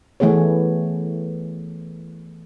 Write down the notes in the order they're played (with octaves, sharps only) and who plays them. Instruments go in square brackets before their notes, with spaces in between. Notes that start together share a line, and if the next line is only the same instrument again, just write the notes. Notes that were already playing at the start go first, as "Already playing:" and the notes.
[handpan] E3 A3 B3 G#4 C#5